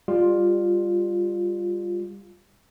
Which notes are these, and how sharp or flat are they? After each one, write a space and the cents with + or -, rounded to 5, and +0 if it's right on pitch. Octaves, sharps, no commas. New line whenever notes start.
G3 +25 F4 +5